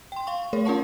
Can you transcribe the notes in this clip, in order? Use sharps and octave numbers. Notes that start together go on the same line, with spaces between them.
G5 C6
F5 C6 C#6
A3 G#4 A#4 C#5
C#4 F4 A#4 F#5 A5 C#6